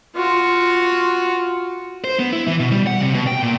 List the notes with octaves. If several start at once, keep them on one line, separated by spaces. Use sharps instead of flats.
F4 F#4
C5
B3
E4
E3
B2
G3
F#5
C3
B2
G5
A#2